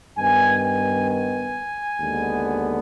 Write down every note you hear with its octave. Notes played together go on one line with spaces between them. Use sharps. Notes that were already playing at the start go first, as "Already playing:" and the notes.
G2 D#3 B3 G#5
G#5
G#5
D#2 D3 G#3 B3